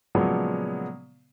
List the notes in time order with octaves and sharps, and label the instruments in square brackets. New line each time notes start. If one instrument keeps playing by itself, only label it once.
[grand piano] A#2 C#3 F3 F#3 G#3 B3